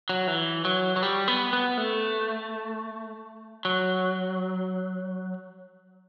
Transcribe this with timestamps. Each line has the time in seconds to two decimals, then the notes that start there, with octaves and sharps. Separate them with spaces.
0.09 F#3
0.27 E3
0.65 F#3
0.96 F#3
1.03 G3
1.28 B3
1.53 B3
1.78 A3
3.65 F#3